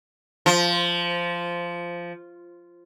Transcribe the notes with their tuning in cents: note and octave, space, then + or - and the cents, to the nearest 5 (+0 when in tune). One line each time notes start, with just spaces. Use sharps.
F3 -10